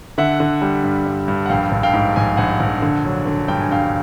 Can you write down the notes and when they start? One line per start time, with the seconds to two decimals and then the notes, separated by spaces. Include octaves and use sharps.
0.18 D3 E5 F#5
0.40 D3
0.62 G3
0.83 G2
1.06 G2
1.28 G2
1.46 F#5
1.49 A#1 F5 G5
1.71 A#1
1.83 F5 G5
1.93 G#2
2.16 A#1 G#5
2.37 A#1 F#5 G#5
2.60 A#1
2.82 D3
3.05 F#3
3.26 D3
3.48 G2 G5
3.60 G#5
3.71 G2 F5 G5